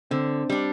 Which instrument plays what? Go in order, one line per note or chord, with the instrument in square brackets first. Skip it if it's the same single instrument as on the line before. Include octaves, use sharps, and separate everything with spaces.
[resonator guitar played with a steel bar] D3 [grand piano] C4
[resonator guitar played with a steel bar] G3 D4